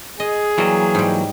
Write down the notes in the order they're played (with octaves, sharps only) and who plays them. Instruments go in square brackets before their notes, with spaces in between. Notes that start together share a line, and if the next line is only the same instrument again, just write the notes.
[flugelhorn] G#4 [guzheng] D#5
[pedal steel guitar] E3 F#3 A#3 [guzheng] G3
[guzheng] G#2 G3